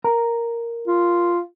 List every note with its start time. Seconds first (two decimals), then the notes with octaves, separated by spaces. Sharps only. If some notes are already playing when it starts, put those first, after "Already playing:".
0.04 A#4 A#5
0.87 F4